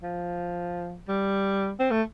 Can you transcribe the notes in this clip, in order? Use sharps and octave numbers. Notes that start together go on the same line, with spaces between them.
F3
G3
C4
A3